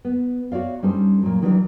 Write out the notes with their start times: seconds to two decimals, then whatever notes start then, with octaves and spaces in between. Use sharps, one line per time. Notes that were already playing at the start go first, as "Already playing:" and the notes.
0.05 B3
0.52 F#4 C#5 D5 F5
0.82 G2 G3 C#4 D#4 A4 C5
1.23 A#2 F#3
1.42 D#3 E3 F#3 G3 B3 D4